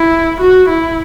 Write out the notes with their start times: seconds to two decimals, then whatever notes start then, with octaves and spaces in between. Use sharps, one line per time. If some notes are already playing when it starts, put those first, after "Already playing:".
Already playing: E4
0.41 F#4
0.69 E4